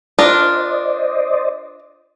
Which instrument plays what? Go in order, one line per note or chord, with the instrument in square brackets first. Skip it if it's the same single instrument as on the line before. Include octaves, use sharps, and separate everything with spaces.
[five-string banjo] D4 F4 A#4 [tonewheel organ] C5 D5 D#5